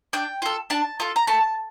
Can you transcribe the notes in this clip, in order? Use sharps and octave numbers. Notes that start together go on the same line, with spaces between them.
D4 G5
F4 A4
D4 A5
F4 A4
A#5
A3 A5